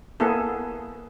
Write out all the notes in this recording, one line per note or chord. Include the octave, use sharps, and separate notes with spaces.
A#3 B3 E4 G#4 A4